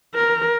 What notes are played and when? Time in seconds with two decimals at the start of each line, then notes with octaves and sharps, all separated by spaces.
0.15 A#4